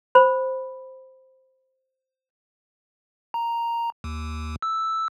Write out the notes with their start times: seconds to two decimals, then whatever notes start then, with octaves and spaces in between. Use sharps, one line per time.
0.15 C5 B5
3.34 A#5
4.04 D#2
4.62 E6